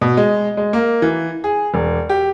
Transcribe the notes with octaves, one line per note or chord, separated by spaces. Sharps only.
B2
G#3
G#3
A#3
E3
G#4
E1
G4